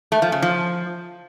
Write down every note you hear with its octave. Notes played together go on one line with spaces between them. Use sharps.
A3
F3
C#3
F3